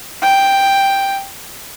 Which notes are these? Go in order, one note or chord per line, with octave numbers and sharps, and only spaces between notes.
G5